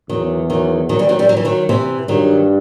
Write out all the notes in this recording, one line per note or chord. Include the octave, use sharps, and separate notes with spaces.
E2 D#3 F#3
D#3 F#3
D#3 F#3
E3 G3
D#3 F#3
E3 G3
F#3
E3
D#3 F#3
C3 E3
G2 D#3 F#3